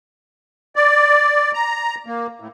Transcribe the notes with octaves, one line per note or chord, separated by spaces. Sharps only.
D5
A#5
A#3
A2